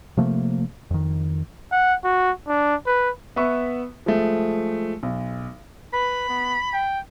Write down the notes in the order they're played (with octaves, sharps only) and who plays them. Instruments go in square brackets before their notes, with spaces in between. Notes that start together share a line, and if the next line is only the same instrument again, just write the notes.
[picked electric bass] C3 F3 A3 A#3
F2 D#3
[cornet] F#5
F#4
D4
B4
[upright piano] B3 B4 E5 C#6
F3 G#3 A3
B1
[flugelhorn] B4 [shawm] B5
[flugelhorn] B3
G5